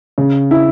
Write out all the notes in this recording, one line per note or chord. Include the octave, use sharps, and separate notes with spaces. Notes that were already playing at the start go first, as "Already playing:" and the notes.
C#3
E4